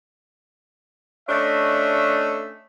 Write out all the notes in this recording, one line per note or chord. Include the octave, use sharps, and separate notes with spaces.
A3 C#4 D4 D#5 E5